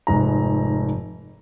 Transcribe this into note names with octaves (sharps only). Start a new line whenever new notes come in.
F1 G#2 A#5